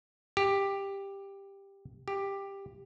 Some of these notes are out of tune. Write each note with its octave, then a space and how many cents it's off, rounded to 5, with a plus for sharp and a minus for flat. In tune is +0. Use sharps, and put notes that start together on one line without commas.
G4 +10
G4 +10